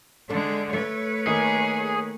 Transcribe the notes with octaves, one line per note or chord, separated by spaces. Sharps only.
D3 G#3 D4 A4
A3 B4 C#5
D#3 A#3 G#4